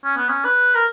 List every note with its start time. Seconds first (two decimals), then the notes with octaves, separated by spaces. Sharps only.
0.05 C#4
0.17 B3
0.29 C#4
0.44 B4
0.75 A#4